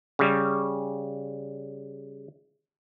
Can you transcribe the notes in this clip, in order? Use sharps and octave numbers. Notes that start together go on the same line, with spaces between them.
C#3 G3